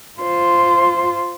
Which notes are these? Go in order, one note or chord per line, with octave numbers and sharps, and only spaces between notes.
F4 C5